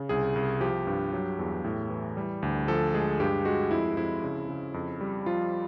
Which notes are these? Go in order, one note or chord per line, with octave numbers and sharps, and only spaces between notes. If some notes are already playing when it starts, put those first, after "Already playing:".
Already playing: C#3
C2 G#4
C2
F3 G4
G2
F#3
E2
A2
E3
G3
D2
F3 A4
G#3 G#4
G2 G4
G#3 F#4
F2 E4
F2 E4
C#3
C#3
F2
G3
F3 F4